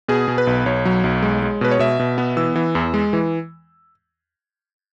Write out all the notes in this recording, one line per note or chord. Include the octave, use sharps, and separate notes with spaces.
B2 G#4
B2
B4
B1
B1 C#5
F#3
B1
G#3
G#3
B2 B4
C#5
B2 E5
B2
B3
E3 E6
E3
E2
G#3
E3